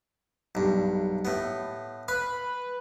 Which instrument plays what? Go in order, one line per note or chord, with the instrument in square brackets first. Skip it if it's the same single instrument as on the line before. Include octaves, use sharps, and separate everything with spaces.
[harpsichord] B1 G2
A2 B3
[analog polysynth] B4 [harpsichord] F5